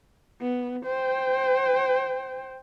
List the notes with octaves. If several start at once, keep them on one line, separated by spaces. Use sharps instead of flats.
B3
C5 G5